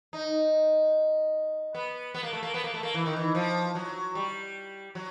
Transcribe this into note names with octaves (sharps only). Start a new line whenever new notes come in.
D#4
B3
B3
A#3
A3
A#3
B3
A#3
A3
A#3
E3
D#3
E3
F3
F#3
G3
F#3